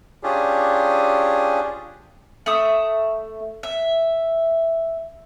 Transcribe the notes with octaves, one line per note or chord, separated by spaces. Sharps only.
C#4 D4 F4 G4 G#4
A3 E5 D#6
E5